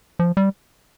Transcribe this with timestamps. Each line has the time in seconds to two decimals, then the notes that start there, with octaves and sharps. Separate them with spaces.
0.19 F3
0.37 G3